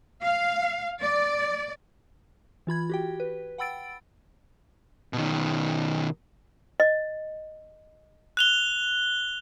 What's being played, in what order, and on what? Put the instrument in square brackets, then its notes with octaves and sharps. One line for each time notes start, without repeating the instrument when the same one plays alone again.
[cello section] F5
D5
[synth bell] E3 F4 B5 G#6
F#4 G4 G5
B4
F#5 G5 B5 E6 A6 D7
[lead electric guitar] B2 D#3
[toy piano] D#5
[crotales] F#6 F7 G7